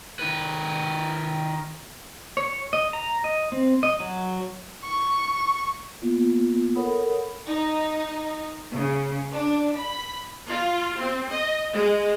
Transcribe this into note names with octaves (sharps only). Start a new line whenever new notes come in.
D#3 B4
C#5
D#5
A#5
D#5
C4
D#5
F#3
C#6
A#3 B3 F4
A4 A#4 C#5 F#5 B5 D#6
D#4
C#3
D4
B5
F4
C4
D#5
G#3